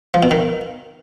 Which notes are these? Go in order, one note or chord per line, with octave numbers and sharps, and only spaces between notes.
F3
B2
D#3